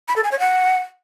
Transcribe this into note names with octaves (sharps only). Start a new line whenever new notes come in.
B5
A4
G#5
C#5
F#5